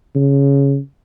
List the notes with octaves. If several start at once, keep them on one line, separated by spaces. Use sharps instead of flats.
C#3